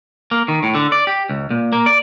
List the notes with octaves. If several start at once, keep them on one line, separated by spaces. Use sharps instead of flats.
A#3
D#3
A2
D3
D5
G4
C#2
A#2
A#3
D5